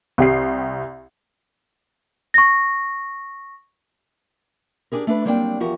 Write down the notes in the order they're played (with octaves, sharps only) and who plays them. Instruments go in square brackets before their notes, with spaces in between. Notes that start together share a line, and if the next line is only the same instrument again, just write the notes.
[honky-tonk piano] C2 G4 C7
[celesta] C#6 A#6
[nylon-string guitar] D4 G4 G#4 A#4
A3 D4 B4
F#3 G3 A#3 C4 D4 G5
E2 F3 F#4 G4 A#4